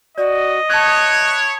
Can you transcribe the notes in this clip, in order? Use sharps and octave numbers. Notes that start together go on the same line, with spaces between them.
F#4 D5 D#5
E4 C#5 A5 D#6 F#6 G#6